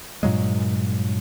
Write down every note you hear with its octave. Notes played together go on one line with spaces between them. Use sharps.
G2 A#2 F#3 G#3